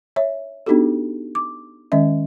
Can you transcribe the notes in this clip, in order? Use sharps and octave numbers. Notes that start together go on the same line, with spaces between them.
C#5 E5
B3 D4 D#4 F#4 G4 A4
D6
D#3 G#3 C#4 D#5 E5